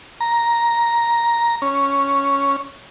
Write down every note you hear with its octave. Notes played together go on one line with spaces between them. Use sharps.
A#5
C#4